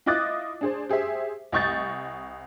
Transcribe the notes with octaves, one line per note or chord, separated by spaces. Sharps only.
E4 F4 D#5 D6 F#6 A6
D4 G#4 C5
G4 G#4 C5 E5
C2 D#5 C#6 G6 A6